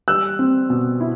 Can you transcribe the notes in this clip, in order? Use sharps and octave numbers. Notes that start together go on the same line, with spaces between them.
G3 E6 F#6
C4
B2
E4